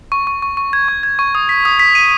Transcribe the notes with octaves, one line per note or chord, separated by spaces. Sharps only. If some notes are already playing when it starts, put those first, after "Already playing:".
C#6
C#6
C#6
C#6
G#6
C#6
G#6
C#6
D#6
B6
D#6
B6
D#7